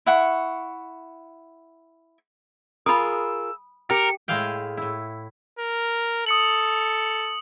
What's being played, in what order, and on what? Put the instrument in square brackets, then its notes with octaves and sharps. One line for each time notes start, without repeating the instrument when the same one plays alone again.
[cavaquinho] E4 F#5 C#6
[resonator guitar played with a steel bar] F4 G#4 A#4 [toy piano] B5 D#6 [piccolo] E6
[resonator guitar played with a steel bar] G4 [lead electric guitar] A#4 [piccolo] C#7
[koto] A2 G#3 E4 G#4 F5 G5
A2 E4
[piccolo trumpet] A#4
[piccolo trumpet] A4 [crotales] D#6 C#7 F#7